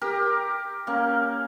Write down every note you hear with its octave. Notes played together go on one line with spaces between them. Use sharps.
G4 A#4
A#3 C#4